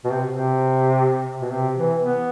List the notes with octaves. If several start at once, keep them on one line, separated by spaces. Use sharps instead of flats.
B2
C3
C3
B2
C3
E3
B3